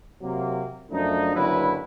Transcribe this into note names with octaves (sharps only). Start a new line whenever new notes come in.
C3 F#3 A#3
F#2 F3 A3 D4 D#4
F#1 B1 D3 F#3 E4 B4